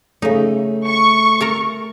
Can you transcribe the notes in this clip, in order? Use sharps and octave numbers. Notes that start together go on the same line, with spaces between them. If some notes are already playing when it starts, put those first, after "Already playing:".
C#3 A3 D#4
C#6
A4 A#4 A#5